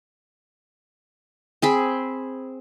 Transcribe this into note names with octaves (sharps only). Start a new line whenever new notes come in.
C4 G#4 B5